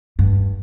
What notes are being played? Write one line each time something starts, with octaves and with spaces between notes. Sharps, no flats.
G2